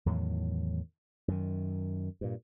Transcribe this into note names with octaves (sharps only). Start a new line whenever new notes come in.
E2 A2 D#3 F#3
F#2 D#3
G2 A#2